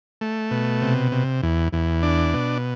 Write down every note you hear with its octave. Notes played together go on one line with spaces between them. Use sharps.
A3
B2
C3
C3
E2
E2
D4
B2